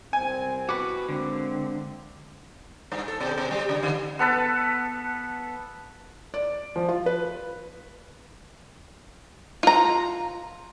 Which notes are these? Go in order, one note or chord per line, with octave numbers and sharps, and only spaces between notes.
C2 C4 G#5
F#4 B4 D6
D3 G#3 A#3 C4
G2
A4
B2
B2
G3
C#3
D3
B3 A4 B4 A5
D5
F3
F4
B4
F4 A#5